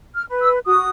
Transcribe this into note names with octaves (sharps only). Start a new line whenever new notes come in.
F6
B4
E6
F#4 D#6